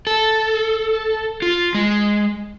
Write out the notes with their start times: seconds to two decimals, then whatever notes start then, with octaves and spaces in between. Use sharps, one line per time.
0.07 A4
1.42 F4
1.74 G#3